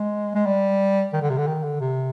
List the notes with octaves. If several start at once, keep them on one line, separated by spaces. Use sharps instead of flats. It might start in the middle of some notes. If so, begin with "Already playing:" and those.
Already playing: G#3
G#3
G3
D#3
D3
C3
D3
D#3
D3
C3